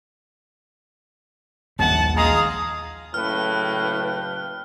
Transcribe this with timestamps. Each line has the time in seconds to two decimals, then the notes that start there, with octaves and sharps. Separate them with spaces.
1.79 A#1 D#2 G3 F#5 A5
2.16 G#3 G#4 F5 A#5 D#6
3.14 F#1 A2 B4 F5 G5 F6